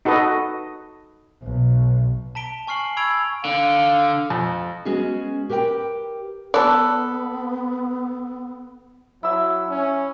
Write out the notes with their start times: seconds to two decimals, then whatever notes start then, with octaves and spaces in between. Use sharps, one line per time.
0.05 D#4 F#4 A4 B4 D#5
1.44 B1
2.35 A5 A#5 B6 D7 G7
2.67 G#5 C#6 F6 C7 F#7
2.97 B5 C#6 E6 G#6 D7 F7
3.45 D3 F5
4.30 F2
4.85 G#3 B3 C#4 F#4 G#4
5.49 G4 A#4 B4 F5 G5
6.54 B3 A4 B4 D5
9.23 F#3 E4 E6
9.69 C#4